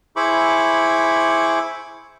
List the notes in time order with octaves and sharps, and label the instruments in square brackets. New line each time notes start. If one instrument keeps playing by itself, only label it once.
[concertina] E4 G#4 C5 B5 C#6 D6